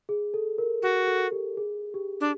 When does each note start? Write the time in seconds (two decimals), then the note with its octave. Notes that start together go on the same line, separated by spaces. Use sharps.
0.09 G#4
0.34 A4
0.58 A#4
0.82 F#4 A#4
1.08 A4
1.32 G4
1.57 G#4
1.94 G4
2.21 D4